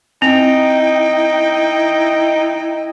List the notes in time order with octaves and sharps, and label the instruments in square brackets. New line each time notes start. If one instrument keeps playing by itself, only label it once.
[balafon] C4 [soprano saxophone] D#4 [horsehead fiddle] E4 D#5 [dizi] G5